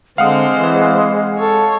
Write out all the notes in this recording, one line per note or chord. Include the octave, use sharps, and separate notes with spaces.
D3 G#3 C4 C5 F5 F#5 D#6
E3
A4 C#5